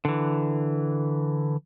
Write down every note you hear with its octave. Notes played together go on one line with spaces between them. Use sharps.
D3 E3